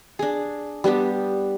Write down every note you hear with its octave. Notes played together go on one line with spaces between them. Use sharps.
D4 G#4
G3 B3 D4 G4